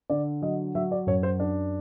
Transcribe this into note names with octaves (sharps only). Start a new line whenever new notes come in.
D3 D5
F#3 D#5
F#3 E5
D5
F#2 C#5
C5
D4